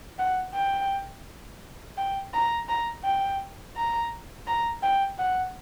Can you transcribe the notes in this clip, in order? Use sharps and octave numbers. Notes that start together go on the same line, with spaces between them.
F#5
G5
G5
A#5
A#5
G5
A#5
A#5
G5
F#5